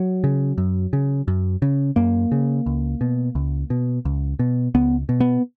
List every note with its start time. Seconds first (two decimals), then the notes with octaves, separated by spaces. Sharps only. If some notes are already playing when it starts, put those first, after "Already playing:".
Already playing: F#3
0.24 C#3
0.58 F#2
0.93 C#3
1.28 F#2
1.62 C#3
1.96 F#2 A#3
2.32 C#3
2.66 C#2
3.01 B2
3.35 C#2
3.70 B2
4.05 C#2
4.39 B2
4.75 C#2 B3
5.09 B2
5.20 B3